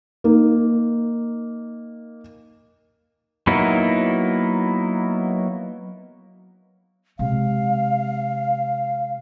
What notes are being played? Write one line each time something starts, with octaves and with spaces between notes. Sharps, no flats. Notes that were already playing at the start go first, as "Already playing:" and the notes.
A#3 D#4
F#3 A#3 B3 D#4 E4
C3 G#3 F5